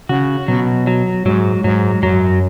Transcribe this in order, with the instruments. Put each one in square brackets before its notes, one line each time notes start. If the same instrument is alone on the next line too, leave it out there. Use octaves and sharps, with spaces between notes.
[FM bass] C#3 [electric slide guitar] F#4
[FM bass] B2 [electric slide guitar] F#3
[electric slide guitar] F#3
[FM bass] G#2 [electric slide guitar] F#3
[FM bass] G#2 [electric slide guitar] F#3
[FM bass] F#2 [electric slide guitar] F#3